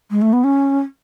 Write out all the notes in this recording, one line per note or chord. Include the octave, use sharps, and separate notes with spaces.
G#3
A3
B3
C#4